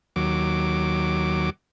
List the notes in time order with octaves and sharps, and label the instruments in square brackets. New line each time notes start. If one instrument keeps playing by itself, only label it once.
[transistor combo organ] D#2 F#3 D6